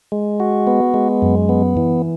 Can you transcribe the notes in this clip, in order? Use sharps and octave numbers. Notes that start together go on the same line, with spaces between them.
G#3
F#4
B3
G#3
F#2
B3
E3